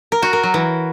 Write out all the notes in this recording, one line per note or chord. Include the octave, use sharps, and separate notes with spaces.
A#4
F#4
A#4
F#3
E3